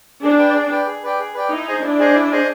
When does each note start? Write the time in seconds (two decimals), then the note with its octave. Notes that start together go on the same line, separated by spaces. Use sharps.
0.22 D4 G#4
0.38 B4 D5 G5
0.54 G#4
0.70 B4 D5 G5
0.86 G#4
1.03 B4 D5 G5
1.19 G#4
1.34 B4 D5 G5
1.50 D#4 E4
1.68 G#4 C5 D#5 G#5
1.83 D4 E4
1.99 G#4 C5 D#5 G#5
2.15 E4
2.32 G#4 C5 D#5 G#5